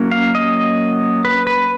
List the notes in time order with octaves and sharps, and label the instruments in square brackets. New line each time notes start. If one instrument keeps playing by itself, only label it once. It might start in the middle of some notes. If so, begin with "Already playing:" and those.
Already playing: [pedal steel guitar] F#3 A#3 C#4
F5
D#5
B4
B4